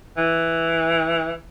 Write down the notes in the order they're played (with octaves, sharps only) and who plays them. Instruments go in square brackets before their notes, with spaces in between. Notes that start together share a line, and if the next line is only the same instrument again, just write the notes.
[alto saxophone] E3